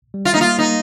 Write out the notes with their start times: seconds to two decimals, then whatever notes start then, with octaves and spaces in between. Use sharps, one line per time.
0.14 G3
0.25 F4
0.34 D#4
0.37 A#3
0.41 F4
0.59 A#3 D#4